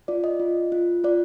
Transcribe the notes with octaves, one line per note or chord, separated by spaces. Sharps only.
F4 D5
D#5
F4
F4
F4 D5